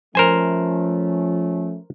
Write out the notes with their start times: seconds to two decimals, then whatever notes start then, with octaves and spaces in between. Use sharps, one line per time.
0.15 F3 A3 C#4 A#4 C5 G#5